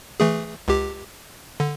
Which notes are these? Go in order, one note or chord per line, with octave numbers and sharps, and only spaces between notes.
E3 A3 G#4
C#2 G4
D3